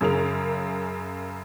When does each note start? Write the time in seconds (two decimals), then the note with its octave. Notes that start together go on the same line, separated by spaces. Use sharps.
0.01 F#2 C#3 A#4 F7